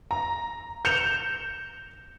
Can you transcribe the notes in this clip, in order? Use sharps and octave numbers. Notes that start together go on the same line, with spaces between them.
A#5
G6 C#7 E7 F7